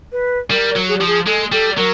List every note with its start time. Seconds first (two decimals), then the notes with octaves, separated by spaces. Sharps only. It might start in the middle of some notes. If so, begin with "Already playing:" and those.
0.12 B4
0.50 G3 A#4
0.76 F#3
0.89 G#4
0.97 F3 G4
1.07 G#4
1.26 G#3 A4
1.52 G3 A4
1.77 F#3 A#4